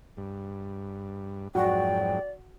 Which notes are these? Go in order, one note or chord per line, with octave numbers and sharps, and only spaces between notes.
G2
F2 G#2 F#3 F#4 D5 G5